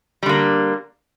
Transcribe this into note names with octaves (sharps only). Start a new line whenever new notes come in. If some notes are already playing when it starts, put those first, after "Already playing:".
D3 G3 A#3